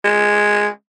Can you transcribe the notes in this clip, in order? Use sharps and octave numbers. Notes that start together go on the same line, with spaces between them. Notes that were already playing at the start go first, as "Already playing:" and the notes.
G#3